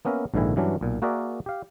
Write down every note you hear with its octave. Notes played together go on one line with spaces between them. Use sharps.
A#3 B3 C#4 A#4 E5
A#1 G#2 D3 D#3 E4 G#5
G2 E3 F#3 C#4 D4
B1 A#2
A#3 F#4 G#4 A#4 D5 E5
G4 F5